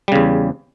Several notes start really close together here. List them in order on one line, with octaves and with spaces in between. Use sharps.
G3 C#3 E2